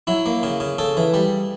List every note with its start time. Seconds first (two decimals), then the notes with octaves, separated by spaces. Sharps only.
0.07 F#3 E4
0.26 A#3
0.43 C#3
0.60 C#3
0.78 C#3 A4
0.97 E3
1.14 G3